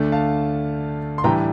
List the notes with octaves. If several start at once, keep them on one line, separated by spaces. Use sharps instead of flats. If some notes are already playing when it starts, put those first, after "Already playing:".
Already playing: D2 D3 A3 D4
F5 A5
C6
A2 E3 G3 D4 G5 A#5